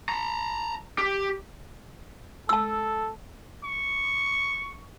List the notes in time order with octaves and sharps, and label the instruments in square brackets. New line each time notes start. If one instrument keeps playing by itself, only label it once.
[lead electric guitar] A5 A#5
G4
[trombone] A4 [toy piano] A5 E6
[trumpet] C#6